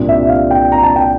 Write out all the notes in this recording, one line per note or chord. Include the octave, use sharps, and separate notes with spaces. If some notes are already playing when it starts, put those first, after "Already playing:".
Already playing: C2 A#2 G3 D4
E5
F5
G5
A#5
A5
G5